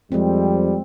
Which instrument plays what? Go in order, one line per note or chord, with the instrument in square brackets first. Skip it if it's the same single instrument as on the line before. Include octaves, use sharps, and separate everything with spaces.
[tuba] F2 [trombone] G3 [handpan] G#3 C4